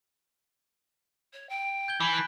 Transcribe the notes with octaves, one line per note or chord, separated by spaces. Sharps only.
C#5
G5
G6 G#6 G7
E3 G#5 B5 D7
A5 F#6 B6